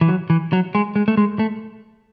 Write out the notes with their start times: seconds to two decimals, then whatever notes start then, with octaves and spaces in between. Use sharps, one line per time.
0.01 E3
0.08 F#3
0.30 E3
0.53 F#3
0.75 G#3
0.96 G#3
1.08 A3
1.17 G#3
1.39 A3